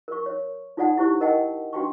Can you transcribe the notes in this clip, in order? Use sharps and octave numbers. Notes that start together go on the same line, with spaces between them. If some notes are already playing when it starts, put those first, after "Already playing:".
A#4 C#6
C#5
D#4 F4 A4 D5 F#5 A5
E4 G4 C5 C#6
A4 A#4 D#5 F#5 G5 A5
D4 F#4 B4 G5 A5 C#6